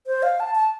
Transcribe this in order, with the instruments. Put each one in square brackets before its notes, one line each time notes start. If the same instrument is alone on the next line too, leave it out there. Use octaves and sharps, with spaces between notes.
[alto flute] C5
F5
A5
A5